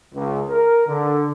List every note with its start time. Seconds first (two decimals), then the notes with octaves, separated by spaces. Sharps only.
0.14 C#2
0.49 A#4
0.86 D3